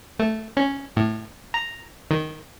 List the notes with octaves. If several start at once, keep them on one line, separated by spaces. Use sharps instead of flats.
A3
C#4
A2
A#5
D#3